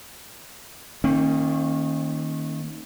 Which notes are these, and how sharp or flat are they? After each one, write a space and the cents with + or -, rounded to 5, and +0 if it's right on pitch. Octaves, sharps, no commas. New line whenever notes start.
D#3 +5 A#3 -30 C#4 -40